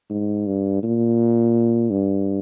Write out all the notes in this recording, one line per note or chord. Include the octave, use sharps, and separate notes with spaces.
G#2
G2
A#2
G2